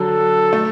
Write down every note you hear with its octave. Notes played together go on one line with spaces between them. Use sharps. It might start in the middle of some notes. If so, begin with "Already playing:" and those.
Already playing: D3 F#3 A4
A3